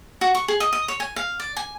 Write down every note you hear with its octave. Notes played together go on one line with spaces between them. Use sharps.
F#4
C#6
G#4
D#5
D#5
C#5
G#5
F5
D5
G#5